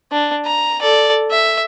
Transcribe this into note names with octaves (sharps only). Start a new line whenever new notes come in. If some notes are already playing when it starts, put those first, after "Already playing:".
D4
A#5
A4 D5
E5